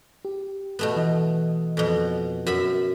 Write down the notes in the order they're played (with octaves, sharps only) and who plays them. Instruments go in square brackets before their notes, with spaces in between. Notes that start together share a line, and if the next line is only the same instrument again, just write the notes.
[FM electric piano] G4
[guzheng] B2 A3 B3
[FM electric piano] E3 D#5
[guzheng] F2 B2
[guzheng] F#2 E5 B5 [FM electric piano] F#4